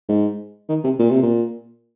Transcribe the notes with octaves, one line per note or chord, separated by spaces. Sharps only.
G#2
D#3
C3
A#2
C3
A#2